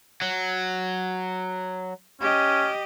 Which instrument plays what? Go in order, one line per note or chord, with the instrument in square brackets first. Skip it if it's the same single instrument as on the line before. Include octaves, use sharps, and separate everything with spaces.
[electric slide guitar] F#3
[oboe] C#4 [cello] G4 D#5